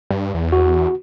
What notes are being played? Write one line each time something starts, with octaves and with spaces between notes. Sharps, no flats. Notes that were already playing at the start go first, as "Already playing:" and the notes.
G2
E2
F#4